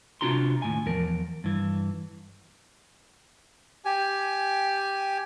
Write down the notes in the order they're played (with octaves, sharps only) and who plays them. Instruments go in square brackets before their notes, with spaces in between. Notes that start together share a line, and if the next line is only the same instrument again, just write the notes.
[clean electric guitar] C3 D4 F4 F#4 A#5 C6
D#2 A2 G#5
E2 F3 A#4
G2 E3
[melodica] G4 G#5